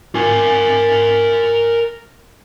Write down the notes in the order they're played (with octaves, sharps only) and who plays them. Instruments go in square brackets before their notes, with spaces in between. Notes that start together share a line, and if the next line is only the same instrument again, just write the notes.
[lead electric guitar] A#4 G#5